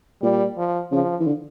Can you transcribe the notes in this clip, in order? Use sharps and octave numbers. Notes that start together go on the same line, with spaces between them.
A#2 G3
F3
C#3 F3
E3
D3